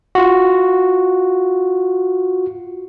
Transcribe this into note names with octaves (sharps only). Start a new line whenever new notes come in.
F4 F#4